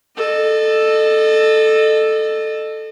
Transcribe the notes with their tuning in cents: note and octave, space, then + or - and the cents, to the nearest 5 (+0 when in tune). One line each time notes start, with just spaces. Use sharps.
A4 +0 D#5 -35